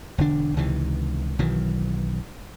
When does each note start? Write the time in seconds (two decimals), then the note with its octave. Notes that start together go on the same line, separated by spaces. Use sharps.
0.18 E1 D3 D4
0.57 C#2 C3 D#3 E3
1.39 B1 D#3 E3 F#3